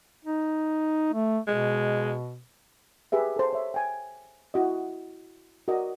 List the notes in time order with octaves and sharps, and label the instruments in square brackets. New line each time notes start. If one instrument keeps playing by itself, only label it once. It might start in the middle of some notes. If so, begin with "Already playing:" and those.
[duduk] D#4
A3
[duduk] B2 [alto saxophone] G#3
[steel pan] G4 G#4 B4 E5
A4 C5
C#5 E5
G5 G#5
E4 F#4 D#5
F#4 A#4 D5 D#5